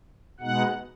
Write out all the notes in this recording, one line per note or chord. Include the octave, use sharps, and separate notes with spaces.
B2 G#3 B3 D#4 F#5